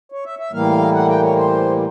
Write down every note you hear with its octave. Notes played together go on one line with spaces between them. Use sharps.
C#5
E5
E5
A2 E3 G3 A#3 F5
F#5
G5
C#5
C5